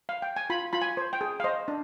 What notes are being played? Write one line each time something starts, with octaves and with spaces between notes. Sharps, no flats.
F5
G5
G#5
F4 B5
F4 B5
G#5
C5
G5
G#4
F5
C5 D#5
D4